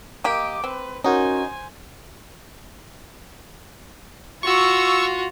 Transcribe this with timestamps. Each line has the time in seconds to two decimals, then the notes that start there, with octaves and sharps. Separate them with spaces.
0.24 A#3 G4 D#5 D6
0.64 C4 B4
1.04 C#4 D#4 F#4 A#4 C5 G#5
4.43 F4 F#4 C#6 E6